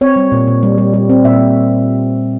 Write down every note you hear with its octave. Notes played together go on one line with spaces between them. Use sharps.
C4 C#5
G3
A#2
A#2
G3
G3
G3
C4
A#2 E5